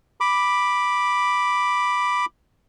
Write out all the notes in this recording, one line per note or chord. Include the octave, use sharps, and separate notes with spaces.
B5 D6